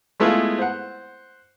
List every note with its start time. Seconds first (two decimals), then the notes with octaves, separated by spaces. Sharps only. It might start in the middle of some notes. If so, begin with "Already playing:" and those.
0.20 G#3 A3 B3 E4 F4 G#4
0.59 C5 F#5